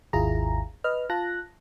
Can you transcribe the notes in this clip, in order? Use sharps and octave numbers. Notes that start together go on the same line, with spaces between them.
G#1 D#2 E4 F4 G#4 A#5
B4 D#5 F6
F4 A5 F#6 A#6